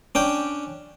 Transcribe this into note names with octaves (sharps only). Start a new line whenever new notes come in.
C#4 D4 G5